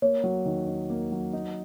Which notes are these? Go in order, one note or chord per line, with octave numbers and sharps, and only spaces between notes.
A#3 C#5
F#3
D#3
D#4
A#3
F#3
D#4